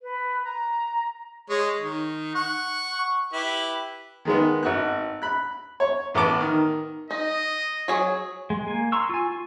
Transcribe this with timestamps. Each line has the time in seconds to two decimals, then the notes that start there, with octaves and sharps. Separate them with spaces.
0.02 B4
0.44 A#5
1.50 G#3 C#5
1.81 D#3
2.35 F#5 C#6
3.33 E4 G4 B4
4.25 D#3 G#3 B3
4.63 G#1 F#4 F#6
5.22 B5 F#6
5.80 C#5
6.14 A1 B3 A5 D6
6.41 D#3
7.11 D#4 D#5
7.88 F#3 G#4 C#5
8.50 G#3
8.67 A#3 G#5
8.92 A#5 C6 C#6 E6
9.09 F4 G#5
9.30 F4